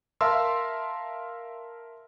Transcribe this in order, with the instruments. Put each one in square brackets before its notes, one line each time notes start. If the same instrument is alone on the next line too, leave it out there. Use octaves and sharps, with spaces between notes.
[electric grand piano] A#4 E5 F5 A5 C6 E6